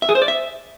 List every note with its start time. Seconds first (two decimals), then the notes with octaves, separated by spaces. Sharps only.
0.02 E5
0.09 G#4
0.15 C5
0.22 D5
0.28 E5